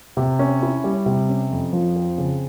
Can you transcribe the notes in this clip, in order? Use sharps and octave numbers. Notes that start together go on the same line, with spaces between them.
C3
C#4
E4
G3
C3
C#4
F2
F3
C4
C#3